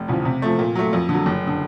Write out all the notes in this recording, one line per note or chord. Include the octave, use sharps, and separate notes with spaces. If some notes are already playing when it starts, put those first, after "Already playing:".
Already playing: F1
E2 C#3 F3
C3
F3 A3
A#2
F#3 A3
F2
D3 F#3
F#1
D3